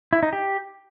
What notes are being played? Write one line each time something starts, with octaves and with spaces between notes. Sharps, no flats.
E4
D#4
G4